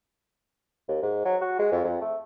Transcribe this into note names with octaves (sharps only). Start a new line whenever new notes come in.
D#2
G#2
F#3
F#4
G#3
F2
F2
A3